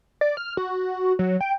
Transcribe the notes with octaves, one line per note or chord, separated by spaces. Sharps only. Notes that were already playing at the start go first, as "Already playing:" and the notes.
D5
F6
F#4
F#3
G5